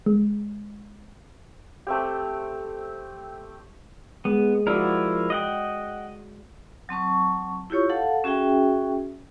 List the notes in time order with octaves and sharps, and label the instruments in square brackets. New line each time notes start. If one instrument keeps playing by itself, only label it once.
[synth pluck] G#3
[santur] A3 C4 G4
[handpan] G#3 [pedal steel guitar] B3
[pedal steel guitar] F3 E4 A#4 [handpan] F#4 D5
[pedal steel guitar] D#5 F#5 G5
[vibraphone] F#3 C4 A5 C#6
E4 F4 G4 C#5 C#6
A4 F5 F#5 A5
C#4 F#4 G#4 E5 G5